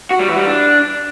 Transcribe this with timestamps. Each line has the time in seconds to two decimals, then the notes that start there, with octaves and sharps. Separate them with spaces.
0.11 F#4
0.19 G3
0.28 E3
0.37 G3
0.46 D4